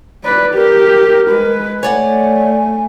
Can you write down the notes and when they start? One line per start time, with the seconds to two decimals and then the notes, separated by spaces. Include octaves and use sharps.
0.24 B4 D5
0.54 G4 A#4
1.29 G#3 B4
1.83 A3 C#5 D5 F#5 G#5